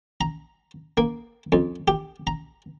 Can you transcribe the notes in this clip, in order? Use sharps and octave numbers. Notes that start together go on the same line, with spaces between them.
A#5
A#3
F2
G4
A#5